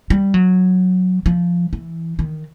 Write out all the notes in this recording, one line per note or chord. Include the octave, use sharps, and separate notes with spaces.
G3
F#3
F3
E3
D#3